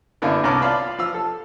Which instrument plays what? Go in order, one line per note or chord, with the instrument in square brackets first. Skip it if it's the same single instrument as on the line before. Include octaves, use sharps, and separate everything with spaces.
[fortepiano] F#2 D3 A#3 B3 D4 E4
C2 B3 C#4 A5 A#5 D6
F4 D5 F5 A5 B5
F3 F5 E6
A4